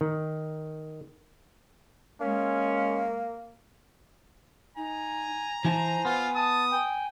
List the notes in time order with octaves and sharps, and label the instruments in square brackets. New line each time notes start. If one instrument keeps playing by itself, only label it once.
[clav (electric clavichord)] D#3
[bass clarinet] G#3 [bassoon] A#3 [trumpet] C#4
[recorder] D#4 [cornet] G#5 [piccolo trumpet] A#5
[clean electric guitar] E3 E4 A5 [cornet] C5 [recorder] G#5
[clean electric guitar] B3 [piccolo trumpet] F4
[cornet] A5 [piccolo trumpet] D#6
[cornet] G5 [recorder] G#5